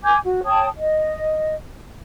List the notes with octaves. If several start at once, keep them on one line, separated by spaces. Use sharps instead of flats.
G#5 D6 G6 G#6
F#4
C#5 G5 A5 D#6
D#5